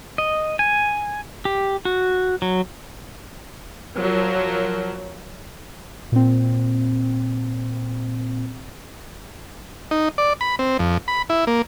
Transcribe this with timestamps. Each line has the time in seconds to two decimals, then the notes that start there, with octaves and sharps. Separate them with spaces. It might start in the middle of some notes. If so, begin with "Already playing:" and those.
0.18 D#5
0.59 G#5
1.45 G4
1.85 F#4
2.42 F#3
3.97 F3 F#3 A#4
6.12 A#2 C4
9.91 D#4
10.18 D5
10.41 B5
10.59 C4
10.79 F2
11.08 B5
11.30 E4
11.47 A#3